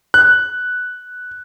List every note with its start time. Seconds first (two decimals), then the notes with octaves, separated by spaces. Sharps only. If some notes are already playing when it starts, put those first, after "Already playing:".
0.14 F#6